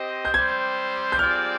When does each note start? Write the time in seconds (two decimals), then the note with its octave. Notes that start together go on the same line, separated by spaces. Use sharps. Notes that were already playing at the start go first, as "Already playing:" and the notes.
Already playing: C4 G4 C5 D#5
0.25 G6
0.34 G3 C4 G4 C5 G#6
1.12 G6
1.19 G3 C4 F4 G#4 D5 F6